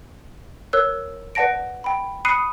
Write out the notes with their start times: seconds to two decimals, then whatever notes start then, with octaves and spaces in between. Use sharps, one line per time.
0.73 A#4 C#5 E6 F#6
1.35 B4 D5 F#5 A5 A#6 D7
1.84 G5 B5
2.25 B5 D#6 F#6 C7 C#7 D#7